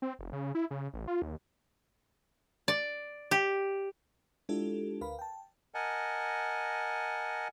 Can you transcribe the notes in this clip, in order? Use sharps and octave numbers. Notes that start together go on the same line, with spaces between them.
C4
F1
C#3
E4
C#3
A1
F4
D#2
D5
G4
G#3 D4 E4 F4 G4 A4
D2 A#4 B4 F5 B5
G5 A5
A#4 D#5 F#5 G#5 A5